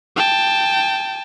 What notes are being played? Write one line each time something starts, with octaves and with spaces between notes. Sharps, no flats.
G5 A5